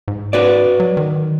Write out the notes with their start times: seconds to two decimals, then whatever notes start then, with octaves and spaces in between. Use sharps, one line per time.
0.08 G#2
0.33 F#4 B4 D5
0.80 F#3
0.97 D#3